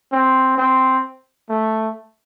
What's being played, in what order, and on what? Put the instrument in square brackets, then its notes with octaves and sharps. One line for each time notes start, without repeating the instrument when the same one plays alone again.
[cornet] C4
C4
A3